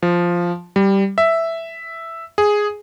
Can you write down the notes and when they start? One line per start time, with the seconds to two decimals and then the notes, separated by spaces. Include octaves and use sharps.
0.03 F3
0.76 G3
1.18 E5
2.38 G#4